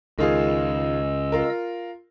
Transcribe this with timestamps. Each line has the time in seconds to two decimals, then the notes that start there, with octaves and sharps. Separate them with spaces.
0.19 C#2 D#3 F4 G#4 D#5 E6
1.32 F4 A#4